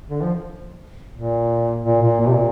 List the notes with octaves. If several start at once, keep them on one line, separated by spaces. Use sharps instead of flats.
D3
F3
A#2
A#2
A#2
A#2
C3
A#2